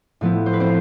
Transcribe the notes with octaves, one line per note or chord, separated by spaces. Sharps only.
A2 F3 B3 E4
C5
B4
C4 C5